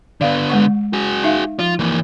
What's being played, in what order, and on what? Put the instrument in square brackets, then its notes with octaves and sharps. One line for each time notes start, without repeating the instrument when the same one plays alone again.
[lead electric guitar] D3 B3 [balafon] D5 F5
[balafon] G#3 F#5 C#6
[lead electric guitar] F#4 G#4
[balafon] D#4 E5 F5
[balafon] F3 [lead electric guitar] F4
[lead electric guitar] E3 A#3